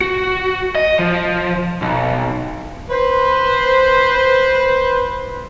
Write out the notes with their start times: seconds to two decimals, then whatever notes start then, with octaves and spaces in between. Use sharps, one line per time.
0.01 F#4
0.75 D#5
0.99 F3
1.82 B1
2.90 B4 C5